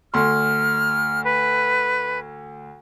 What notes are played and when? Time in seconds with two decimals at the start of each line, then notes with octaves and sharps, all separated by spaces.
0.14 D2 C6 F6
1.24 B4